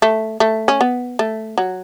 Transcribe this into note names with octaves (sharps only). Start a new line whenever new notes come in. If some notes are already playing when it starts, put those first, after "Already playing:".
A3
A3
C#4
B3
A3
F#3